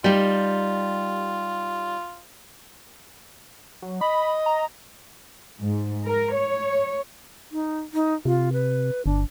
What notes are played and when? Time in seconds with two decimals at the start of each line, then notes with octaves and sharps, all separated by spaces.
0.04 G3 D#4 F4 G4
3.82 F#3
4.01 D#5 B5
4.46 A#5
5.60 G#2
6.06 A#4
6.34 C#5
7.52 D#4
7.94 D#4
8.25 C3 F4
8.53 B4
9.06 G1 D4